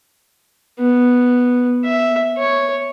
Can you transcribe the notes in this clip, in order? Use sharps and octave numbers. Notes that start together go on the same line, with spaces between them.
B3
E5
C#5